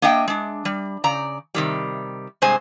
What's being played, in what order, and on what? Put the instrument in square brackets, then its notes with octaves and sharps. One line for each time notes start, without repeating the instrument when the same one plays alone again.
[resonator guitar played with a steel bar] A#3 D4 D#5 E5 G5
G#3 D4
G3
C#3 D5 A#5
C3 D#3 G3
G2 C3 G#3 C5 G#5